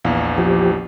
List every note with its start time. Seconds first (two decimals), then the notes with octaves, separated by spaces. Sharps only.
0.05 A#1 E2 F5
0.38 F3 G4